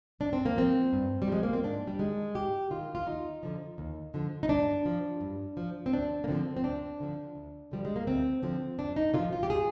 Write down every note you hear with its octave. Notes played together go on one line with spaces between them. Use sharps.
G2 D4
C4
A#3
F3 C4
G2
G3
F3 G#3
A#3
C4
G#2 D4
G3
D#3 G#3
G#2 G4
D#3 F4
F4
D#2 D#4
D3 F3
D#2
D3 F3
D#4
G2 D4
F3
G2
F3
C4
D2 D4
A#3
D3 F3 C4
C4
D2 D4
D3 F3
D2
D3 F3 G3
G#3
A#3
D2 C4
D3 F3 C4
F2 D4
D#4
D3 F3 F4
F4
G4
G#4